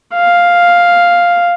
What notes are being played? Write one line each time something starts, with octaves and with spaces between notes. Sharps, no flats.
F5